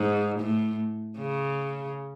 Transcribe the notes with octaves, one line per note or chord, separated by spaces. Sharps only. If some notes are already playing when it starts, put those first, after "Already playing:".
Already playing: G#2
A2
C#3